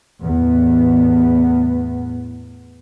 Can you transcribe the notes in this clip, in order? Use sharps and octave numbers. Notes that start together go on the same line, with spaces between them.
E2 A2 B3